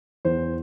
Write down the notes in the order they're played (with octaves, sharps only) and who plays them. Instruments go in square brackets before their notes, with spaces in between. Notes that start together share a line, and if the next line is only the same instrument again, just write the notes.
[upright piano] E2 C5